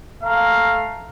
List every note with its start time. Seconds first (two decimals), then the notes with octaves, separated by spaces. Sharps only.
0.21 A3 F5 A#5